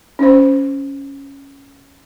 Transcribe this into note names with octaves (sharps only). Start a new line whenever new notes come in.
C#4 C5